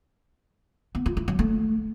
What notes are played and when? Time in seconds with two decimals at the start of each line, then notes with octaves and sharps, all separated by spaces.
0.95 B3
1.06 F4
1.17 E4
1.28 F#3
1.39 A3